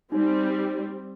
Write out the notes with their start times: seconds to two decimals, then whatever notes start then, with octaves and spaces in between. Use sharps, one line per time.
0.12 G3 C4 D#4